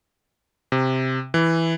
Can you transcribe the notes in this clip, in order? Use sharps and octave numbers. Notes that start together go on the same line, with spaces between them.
C3
E3